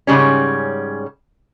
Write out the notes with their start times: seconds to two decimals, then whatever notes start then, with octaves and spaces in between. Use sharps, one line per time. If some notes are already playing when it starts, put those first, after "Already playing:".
0.07 G#2 C#3 G3 C#4